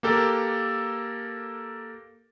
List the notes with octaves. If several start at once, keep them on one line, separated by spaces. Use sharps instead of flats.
A#3 G4 A4 A#4